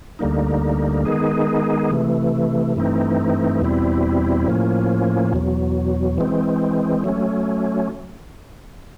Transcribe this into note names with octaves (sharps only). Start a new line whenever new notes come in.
D2 D3 G3 A#3 D#4
D#3 G#3 B3 D#4 G#4
C3 E3 A3
G2 E3 A3 C4 D#4
E2 B2 G3 C4 E4
A2 F3 A#3 C#4
E2 B2 F#3
E3 G#3 C4
F#3 A3 C#4